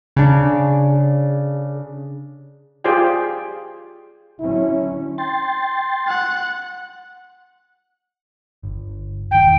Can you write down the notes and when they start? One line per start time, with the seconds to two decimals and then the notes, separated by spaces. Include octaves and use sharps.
0.16 C#3 D4
2.84 F4 G4 G#4 C5 D5 G5
4.40 D3 F#3 C#4 E4
5.18 G5 C6 A6
6.08 F#5
8.63 G1
9.31 E1 D#3 G5